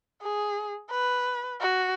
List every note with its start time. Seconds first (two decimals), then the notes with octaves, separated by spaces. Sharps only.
0.21 G#4
0.90 B4
1.60 F#4